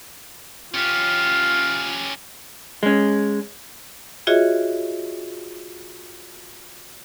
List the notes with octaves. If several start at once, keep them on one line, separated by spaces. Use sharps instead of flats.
C#4 F4 G4
G#3 C#4
F4 F#4 G#4 C#5 D#5 E5